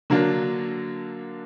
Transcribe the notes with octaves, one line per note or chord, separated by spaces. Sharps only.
D3 F#3 A#3 D4